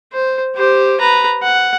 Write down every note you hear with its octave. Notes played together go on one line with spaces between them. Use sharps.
C5
G4 C5
B4 A#5
F#5